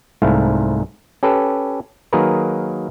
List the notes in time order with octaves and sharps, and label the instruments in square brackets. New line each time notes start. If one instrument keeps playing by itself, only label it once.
[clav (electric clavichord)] C2 G#2 A3 E4 F5
C#4 G4 A4 B4
D#3 F#3 A#3 G#4 A#4 B4